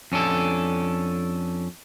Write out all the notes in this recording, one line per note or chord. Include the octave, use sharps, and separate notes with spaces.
F2 C#4 D4 A4